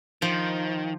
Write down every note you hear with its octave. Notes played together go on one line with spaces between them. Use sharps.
D#3 F3